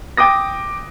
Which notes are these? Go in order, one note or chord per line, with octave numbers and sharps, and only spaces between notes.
G5 D6 D#6 A#6